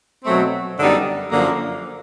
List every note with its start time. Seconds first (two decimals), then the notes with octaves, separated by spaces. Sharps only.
0.25 B2 F#3 A3 C4
0.79 F#2 D3 G3 B3 D#4
1.32 F#2 D3 F3 A#3